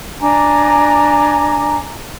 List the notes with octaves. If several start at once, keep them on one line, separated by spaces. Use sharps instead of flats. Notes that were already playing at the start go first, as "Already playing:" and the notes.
D4 G#5 A#5 D6